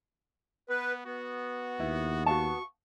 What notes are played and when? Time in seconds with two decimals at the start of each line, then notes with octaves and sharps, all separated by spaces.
0.69 B3 B4
1.06 B3 F#4
1.80 D#2 E4
2.26 F#4 F5 A5 C#6